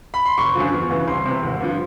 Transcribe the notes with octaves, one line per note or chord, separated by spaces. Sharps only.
B5
C6
F#1 C#6
F#2 D3 F3
E2
C#3 E3
C2 C6
C3 E3
G#1
G2 D3 F3